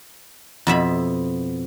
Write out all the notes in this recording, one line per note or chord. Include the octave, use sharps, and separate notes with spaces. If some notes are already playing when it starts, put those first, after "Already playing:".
F2 B2 E5 B5